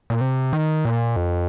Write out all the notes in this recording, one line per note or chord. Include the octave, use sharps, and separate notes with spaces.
A#2
C3
D#3
A#2
F2